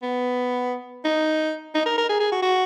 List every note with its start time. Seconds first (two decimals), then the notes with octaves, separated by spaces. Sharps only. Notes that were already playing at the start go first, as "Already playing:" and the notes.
0.03 B3
1.05 D#4
1.75 D#4
1.86 A#4
1.98 A#4
2.09 G#4
2.20 G#4
2.32 F#4
2.42 F#4